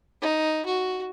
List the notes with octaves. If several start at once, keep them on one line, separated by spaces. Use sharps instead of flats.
D#4
F#4